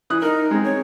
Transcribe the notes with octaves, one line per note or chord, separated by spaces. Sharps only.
E3 D#6 F#6
D#4 A#4
G#3 C4
C#5